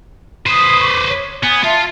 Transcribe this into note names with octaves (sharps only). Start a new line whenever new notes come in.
B4 C5 D#6
C#6 D6
C#5
B3 G#5 D#6 G#6
F4 E5 A5 C6